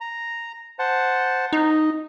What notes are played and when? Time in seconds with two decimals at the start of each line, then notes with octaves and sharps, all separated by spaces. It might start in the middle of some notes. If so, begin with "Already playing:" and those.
0.01 A#5
0.79 C5 F#5 A5
1.53 D#4 D#5